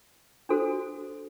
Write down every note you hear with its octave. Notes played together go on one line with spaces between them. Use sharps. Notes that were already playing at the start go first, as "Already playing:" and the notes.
D4 F#4 A4 C5